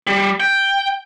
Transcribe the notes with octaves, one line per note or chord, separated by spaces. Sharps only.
G3
G5